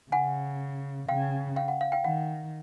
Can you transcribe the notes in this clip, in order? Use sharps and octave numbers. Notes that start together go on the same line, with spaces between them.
C#3 F#5 G#5
C#3 F5 G5
F5 G5
F#5
F5
F5 G5
D#3 F#5